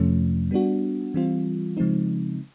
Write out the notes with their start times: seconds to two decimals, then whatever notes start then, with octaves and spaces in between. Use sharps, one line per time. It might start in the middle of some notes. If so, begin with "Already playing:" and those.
Already playing: F2 C3 F3 A3 C#4
0.51 G3 B3 D4 F#4
1.14 E3 G3 C4 F4
1.77 C#3 F3 G#3 C4 D#4